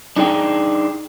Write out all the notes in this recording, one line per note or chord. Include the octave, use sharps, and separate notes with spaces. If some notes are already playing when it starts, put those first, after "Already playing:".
D4 D#4 G#4 G5